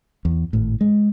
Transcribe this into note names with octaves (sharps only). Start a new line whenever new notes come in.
E2
G#1 A2
G#3